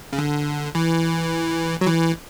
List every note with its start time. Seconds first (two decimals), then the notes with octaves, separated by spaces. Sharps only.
0.13 C#3
0.18 D3
0.75 E3
1.81 F#3
1.87 E3